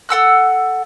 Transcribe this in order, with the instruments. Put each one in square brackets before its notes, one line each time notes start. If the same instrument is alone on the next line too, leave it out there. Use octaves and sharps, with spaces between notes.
[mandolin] A4 F#5 E6 F#6